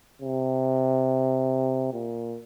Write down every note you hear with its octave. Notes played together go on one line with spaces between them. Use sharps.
C3
A#2